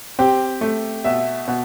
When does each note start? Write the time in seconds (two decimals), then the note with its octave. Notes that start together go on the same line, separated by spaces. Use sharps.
0.19 C4 G4
0.61 A3
1.05 B2 E5
1.48 B2